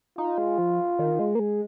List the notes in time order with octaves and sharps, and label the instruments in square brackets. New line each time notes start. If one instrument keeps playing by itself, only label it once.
[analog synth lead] D#4 [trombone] F4
[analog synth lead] G#3
F3
D#3
G#3
A#3
G#3